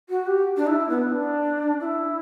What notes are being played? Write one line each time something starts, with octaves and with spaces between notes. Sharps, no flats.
F#4
G4
D4
E4
B3
D4
E4